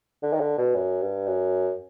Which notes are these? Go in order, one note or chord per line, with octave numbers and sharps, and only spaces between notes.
D3
D#3
D3
B2
F#2
G2
F#2